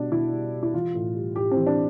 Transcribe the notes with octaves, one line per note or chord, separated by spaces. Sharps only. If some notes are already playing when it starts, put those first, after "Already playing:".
Already playing: B2 G3 D4
B2 E4
G3
G3
E4
E3 F4
A2
G3
A2 G4
C4
E3
D4